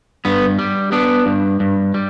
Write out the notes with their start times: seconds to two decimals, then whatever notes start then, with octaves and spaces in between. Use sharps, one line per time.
0.25 G2 B3
0.59 G3
0.92 B3 D4
1.26 G2
1.60 G2
1.94 G3